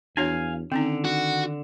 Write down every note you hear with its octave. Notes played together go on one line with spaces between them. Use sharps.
E2 D4 F#4 C#5 F5 G#5
D3 D#3 C4 C#4 D#4
F#4